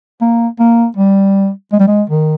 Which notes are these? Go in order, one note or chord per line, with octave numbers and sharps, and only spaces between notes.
A#3
A#3
G3
G#3
G3
G#3
D#3